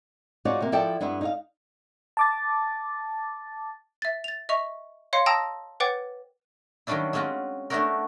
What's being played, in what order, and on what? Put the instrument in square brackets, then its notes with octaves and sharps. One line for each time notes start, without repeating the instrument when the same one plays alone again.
[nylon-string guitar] D#4 F4 F#4 G#4 C#5 D5
C3 A#3
F3 E4 A4 D5 G5 A5
G2 B3 D4 E4
D#4 G#4 F5
[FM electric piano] A5 D6 A6
[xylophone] E5 A6
A6 F7
D#5 E5 C#6 F7
C#5 D#5 F5 C6 C#7
G5 A5 A#5 D#6 E6 A#6
B4 C#5 F#5 G5 D6 A6
[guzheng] D#3 F#3 G3 C#4 D4 E4
G#3 C4 C#4 F4 F#4
A3 B3 D4 E4 F#4 A#4